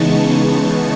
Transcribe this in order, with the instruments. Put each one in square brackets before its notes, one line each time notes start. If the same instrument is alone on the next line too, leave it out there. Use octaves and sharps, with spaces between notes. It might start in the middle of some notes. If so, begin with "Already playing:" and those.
Already playing: [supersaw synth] C#3 E3 G#3 B3 D#4 A5 C#6